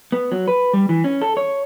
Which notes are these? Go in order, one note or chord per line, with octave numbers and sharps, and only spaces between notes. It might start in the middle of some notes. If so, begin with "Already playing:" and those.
B3
F#3
B4
G3
E3
C#4
A4
C#5